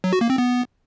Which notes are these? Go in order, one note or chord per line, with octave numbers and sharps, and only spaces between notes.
F#3
F#4
A#3
C4
B3